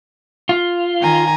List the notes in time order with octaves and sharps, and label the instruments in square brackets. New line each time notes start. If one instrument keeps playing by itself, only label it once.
[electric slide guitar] F4
[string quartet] D#3 G#5 A#5